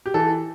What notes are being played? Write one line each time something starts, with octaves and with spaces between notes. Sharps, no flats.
G4
E3 A4